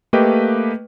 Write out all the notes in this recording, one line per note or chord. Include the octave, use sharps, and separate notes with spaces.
A3 A#3 G4 B4 D#5 G5